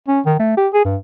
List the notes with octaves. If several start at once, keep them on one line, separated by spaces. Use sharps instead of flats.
C#4
D#3
A3
G4
G#4
G2